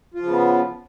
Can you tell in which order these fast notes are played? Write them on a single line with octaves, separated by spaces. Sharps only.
F4 F3 C#3 B3